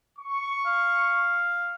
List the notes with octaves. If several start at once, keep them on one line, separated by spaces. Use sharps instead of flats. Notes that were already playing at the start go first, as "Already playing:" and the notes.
C#6
F5